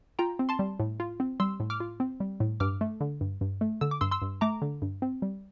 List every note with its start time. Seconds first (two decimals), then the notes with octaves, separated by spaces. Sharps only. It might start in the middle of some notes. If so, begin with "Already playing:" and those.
0.19 F4 G5 A#5
0.39 C4
0.49 A5 C6
0.59 G3
0.80 A2
1.00 F4
1.20 C4
1.40 G3 C6 E6
1.60 A2
1.70 D6 F6
1.80 F4
2.00 C4
2.20 G3
2.40 A2
2.60 G2 D6 F6
2.81 A3
3.01 D3
3.21 G2
3.41 G2
3.61 A3
3.81 D3 E6
3.91 D6
4.01 G2 C6 E6
4.11 C6 E6
4.22 G2
4.41 A3 A#5 D6
4.62 D3
4.82 G2
5.02 C4
5.22 G3